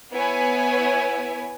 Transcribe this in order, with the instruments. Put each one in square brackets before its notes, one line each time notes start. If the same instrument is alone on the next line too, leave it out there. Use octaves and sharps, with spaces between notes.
[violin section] B3 E4 B4 C#5 G#5